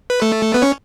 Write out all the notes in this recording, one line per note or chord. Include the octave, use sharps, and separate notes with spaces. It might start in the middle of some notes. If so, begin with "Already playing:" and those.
B4
A3 A4
B3 B4
C#4 C#5